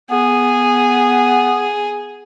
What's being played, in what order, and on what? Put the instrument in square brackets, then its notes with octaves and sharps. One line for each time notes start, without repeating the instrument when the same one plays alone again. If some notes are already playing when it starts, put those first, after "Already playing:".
[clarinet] B3 [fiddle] G#4